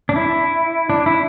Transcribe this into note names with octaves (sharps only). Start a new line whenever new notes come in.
D4
E4
D4
E4